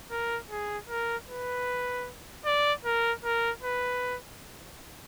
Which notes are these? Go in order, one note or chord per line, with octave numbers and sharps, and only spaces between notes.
A#4
G#4
A#4
B4
D5
A#4
A#4
B4